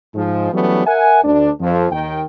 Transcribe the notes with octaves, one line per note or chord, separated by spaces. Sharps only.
G#2 F3 G#3
E3 F#3 G3 A3 B3 C#4
A#4 E5 F#5 G#5
D2 D4
F2 F3
D#2 D#3 G5